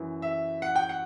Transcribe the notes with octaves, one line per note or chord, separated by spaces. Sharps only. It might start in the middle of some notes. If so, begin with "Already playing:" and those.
Already playing: F#2 E3
E5
F#5
G5
F#5